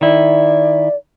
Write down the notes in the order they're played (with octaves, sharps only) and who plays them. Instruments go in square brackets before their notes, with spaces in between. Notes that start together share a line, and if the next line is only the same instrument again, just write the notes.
[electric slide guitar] D#3 E4 [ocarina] D5